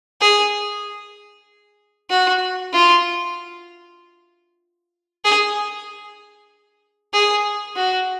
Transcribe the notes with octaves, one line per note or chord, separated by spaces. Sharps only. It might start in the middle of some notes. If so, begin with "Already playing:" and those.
G#4
F#4
F4
G#4
G#4
F#4